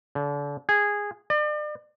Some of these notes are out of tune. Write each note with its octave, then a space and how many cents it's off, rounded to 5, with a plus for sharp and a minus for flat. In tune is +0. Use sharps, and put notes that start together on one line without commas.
D3 -35
G#4 -10
D5 +40